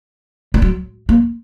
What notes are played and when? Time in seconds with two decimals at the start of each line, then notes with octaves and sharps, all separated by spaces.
0.54 G3
0.62 F#3
1.09 A#3